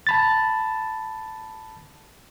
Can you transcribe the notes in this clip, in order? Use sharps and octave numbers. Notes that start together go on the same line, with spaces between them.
A5 B5 A6